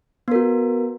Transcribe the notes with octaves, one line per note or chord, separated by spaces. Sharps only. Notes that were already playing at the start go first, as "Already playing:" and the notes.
B3 F#4 A#4